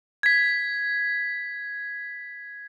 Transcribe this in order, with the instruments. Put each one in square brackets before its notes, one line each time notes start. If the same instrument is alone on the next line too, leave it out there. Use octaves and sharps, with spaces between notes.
[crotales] G#6 B6